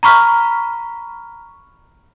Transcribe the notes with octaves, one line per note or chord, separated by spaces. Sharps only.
A#5 B5 C#6 F6 B6